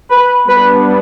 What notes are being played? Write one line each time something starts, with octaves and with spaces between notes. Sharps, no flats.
B4
G3 B3 D4 B4